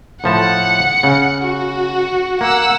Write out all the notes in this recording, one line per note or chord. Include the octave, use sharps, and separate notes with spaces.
A2 F3 F#5 A5 C#7
C#3
F#4
A#3 F#5 E6